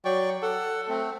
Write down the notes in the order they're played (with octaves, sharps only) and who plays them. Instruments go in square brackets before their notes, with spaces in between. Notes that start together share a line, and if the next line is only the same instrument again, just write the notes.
[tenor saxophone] F#3 [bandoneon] D5 G5 C#6
[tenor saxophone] A4 [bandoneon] F#5
[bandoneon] A3 C4